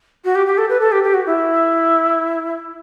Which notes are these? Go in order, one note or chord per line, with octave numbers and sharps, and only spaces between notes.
F#4
G4
G4
A4
B4
A4
G4
G4
F#4
E4